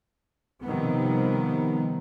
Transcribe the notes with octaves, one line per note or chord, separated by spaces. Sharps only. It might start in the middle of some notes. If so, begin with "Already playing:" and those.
C3 D#3 F3 G3 B3